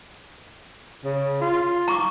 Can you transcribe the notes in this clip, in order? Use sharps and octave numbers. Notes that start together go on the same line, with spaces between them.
C#3
F4
A#5 C#6 D6